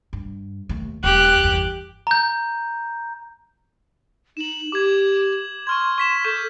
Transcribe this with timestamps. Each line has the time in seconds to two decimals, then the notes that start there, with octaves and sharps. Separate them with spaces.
0.13 G2
0.69 D#2 A3
1.04 D#1 G4 F#6
1.43 G1 E2
2.07 A#5 G6
4.37 D#4 E7 F#7
4.72 G4 D6 G#6
5.67 C6 C#6 F6 G#6
5.98 C#6 B6 E7
6.25 A4 C#6 G6 E7